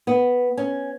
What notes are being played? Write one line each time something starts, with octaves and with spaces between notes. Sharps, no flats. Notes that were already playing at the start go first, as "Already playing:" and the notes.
B3
C#4